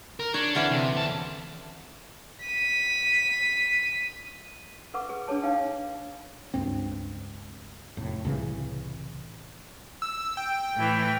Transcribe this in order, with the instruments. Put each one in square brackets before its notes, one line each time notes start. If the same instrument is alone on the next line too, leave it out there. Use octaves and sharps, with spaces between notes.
[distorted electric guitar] A#4
[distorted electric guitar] D4 [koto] C#5
[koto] D3 E3 C#4
[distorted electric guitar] C3
E2 A5
[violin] B6 D#7
[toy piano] A4 B4 F#5 C#6 D6
G#4 B4
D4 G#4 B4 C#5 A5
D#4 C#5 F5 G5
[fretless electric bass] C#2 G2 C4
F1 A2
C2 A2 C#3 E3
[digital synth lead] E6
G5
[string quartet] A2 E3